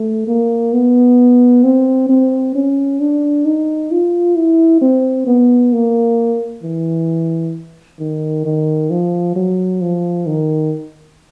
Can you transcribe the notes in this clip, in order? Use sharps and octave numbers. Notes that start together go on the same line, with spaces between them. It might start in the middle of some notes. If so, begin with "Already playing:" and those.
Already playing: A3
A#3
B3
C4
C4
C#4
D4
D#4
F4
E4
C4
B3
A#3
E3
D#3
D#3
F3
F#3
F3
D#3